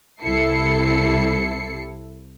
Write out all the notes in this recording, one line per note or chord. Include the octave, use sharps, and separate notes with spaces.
C2 C3 E4 A4 C7 C#7